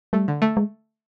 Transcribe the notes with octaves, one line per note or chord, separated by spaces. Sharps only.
G3 A3
D3
A3
G#3